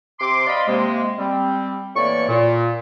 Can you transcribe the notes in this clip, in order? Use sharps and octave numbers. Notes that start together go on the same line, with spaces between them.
C3 C6 D6
D5 D#5 F5 B5 C6
C3 G#3 A#3
G3 C4
A2 E3 A#3 D5 C#6
A#2